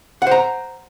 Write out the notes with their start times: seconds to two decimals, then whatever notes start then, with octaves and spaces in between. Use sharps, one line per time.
0.22 F#5
0.27 C5
0.31 A#5